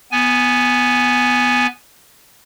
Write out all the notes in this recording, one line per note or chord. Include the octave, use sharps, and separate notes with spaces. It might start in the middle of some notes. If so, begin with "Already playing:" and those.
B3 G#5